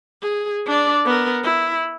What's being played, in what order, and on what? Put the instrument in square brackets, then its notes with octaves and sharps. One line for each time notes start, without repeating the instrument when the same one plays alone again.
[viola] G#4
D4 D5
B3 A#4
E4